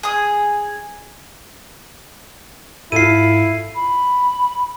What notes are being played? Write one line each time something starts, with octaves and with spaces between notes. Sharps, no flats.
G#4 D#6
G#2 E4 F4 A4 C7 D#7
B5